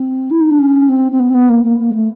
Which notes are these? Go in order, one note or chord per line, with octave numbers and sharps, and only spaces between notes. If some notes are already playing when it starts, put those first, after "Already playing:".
Already playing: C4
E4
D#4
D4
C#4
C4
C4
B3
C4
B3
A#3
A#3
A#3
G#3
A3